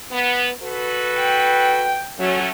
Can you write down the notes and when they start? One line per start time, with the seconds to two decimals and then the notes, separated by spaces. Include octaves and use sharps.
0.11 B3
0.62 F#4 A4 B4
1.18 G5
2.19 F#3 A3 C#4